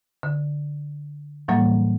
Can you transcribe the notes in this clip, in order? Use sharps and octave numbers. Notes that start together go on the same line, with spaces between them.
D3
A2 E3 F#3 G3 A#3